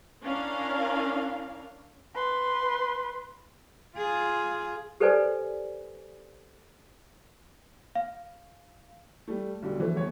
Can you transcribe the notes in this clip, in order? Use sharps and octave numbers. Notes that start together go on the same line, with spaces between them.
C#4 D4 E4 A#4 F5
B4 C6
F4 G#4
G4 A4 B4 C5 D5 G#5
F5
G3 A3
B1 D3 G3
E3 F3 A3
G1 C#5